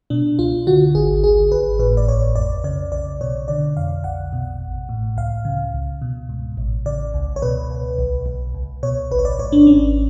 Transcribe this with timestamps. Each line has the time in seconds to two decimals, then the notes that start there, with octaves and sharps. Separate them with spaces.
0.10 B2 D4
0.39 C#2 F4
0.67 D3 F#4
0.95 G#1 G#4
1.24 G#1 G#4
1.52 G#1 B4
1.79 A2 B4
1.97 D5
2.08 B1 C#5
2.36 F2 D5
2.64 C#3 D5
2.92 B1 D5
3.21 B2 C#5
3.48 D3 D5
3.77 F2 F5
4.04 B1 F#5
4.33 B2
4.61 A1
4.89 A2
5.17 C#2 F5
5.45 C#3
5.74 C#2
6.02 B2
6.29 G#2
6.57 A1
6.86 C#3 D5
7.14 C#2
7.36 C#5
7.42 B2 B4
7.70 C#2
7.98 B1
8.26 B1
8.54 C#2
8.83 B2 C#5
9.11 A1 B4
9.19 C#5
9.25 D5
9.39 G#2 C#5
9.52 D4
9.67 G#1 C#4